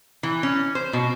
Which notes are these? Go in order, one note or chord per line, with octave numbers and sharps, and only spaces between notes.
E3
C#4
C5
B2